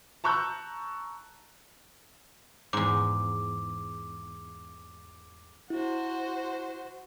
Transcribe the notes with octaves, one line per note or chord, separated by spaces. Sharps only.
A5 A#5 C#6 E6 F#6 G6
E2 G#2 D6
E4 F#4 C5